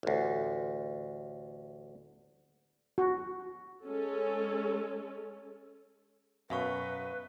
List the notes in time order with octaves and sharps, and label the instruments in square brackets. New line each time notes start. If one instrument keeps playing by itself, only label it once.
[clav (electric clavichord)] A1 D2
[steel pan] F#4
[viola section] G#3 C#4 A4
[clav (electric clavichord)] F#2 B2 [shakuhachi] B4 [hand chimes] E5 F5 C#6